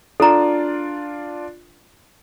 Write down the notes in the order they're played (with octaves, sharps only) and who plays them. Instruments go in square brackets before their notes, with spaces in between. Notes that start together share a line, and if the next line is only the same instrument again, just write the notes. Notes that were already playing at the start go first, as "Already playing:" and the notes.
[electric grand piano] D4 F4 D5 [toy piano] A4 A#5